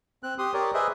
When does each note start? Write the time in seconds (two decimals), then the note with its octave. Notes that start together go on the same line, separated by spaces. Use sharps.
0.23 C4 F#6
0.39 G4 C6 D#6
0.54 G4 A#4 C#5 D5
0.74 G#4 B4 C5 D#5 E5